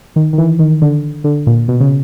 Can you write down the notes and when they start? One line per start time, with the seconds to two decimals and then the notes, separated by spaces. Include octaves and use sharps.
0.16 D#3
0.33 D#3
0.38 E3
0.59 D#3
0.82 D3
1.24 D3
1.47 A#2
1.68 B2
1.80 C#3